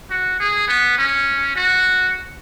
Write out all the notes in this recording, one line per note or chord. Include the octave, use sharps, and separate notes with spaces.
F#4
G#4
B3
C#4
F#4